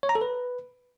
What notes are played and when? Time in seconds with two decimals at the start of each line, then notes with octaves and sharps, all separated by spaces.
0.03 C#5
0.09 A#5
0.15 A4
0.21 B4